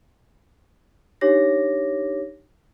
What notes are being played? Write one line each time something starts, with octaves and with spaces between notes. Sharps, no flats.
D4 D#4 G4 C#5 D6 A#6